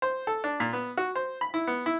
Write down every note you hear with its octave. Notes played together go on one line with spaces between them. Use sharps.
C5
A4
D4
A#2
B3
F#4
C5
B5
E4
B3
E4